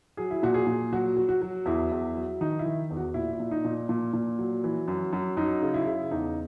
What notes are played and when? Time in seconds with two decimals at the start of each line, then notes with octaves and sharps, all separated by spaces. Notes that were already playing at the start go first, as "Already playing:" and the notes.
0.17 F#3 G#4
0.31 E4
0.43 A#2 F#4
0.54 G#4
0.67 A#2
0.93 F#3 F#4
1.17 F#3
1.29 F#4
1.42 F#3
1.66 E2 E4
1.92 E2
2.15 F#3
2.41 D#3 D#4
2.59 E4
2.66 D#3
2.91 E2
2.97 F#4
3.14 A#2 E4
3.33 E4
3.40 A#2
3.51 D#4
3.65 A#2
3.89 A#2
4.13 A#2
4.39 F#3
4.64 E3
4.88 F#2
5.13 F#2
5.37 F#2 D#4
5.62 C#3
5.74 E4
5.86 C#3
6.11 E2 D#4